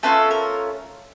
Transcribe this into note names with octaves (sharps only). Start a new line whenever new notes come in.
A3 C#4 F4 A4 B4
A#4